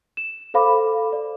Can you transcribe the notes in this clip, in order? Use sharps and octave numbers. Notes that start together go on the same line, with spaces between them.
E7
A4 C5 F5 B5 D6
D5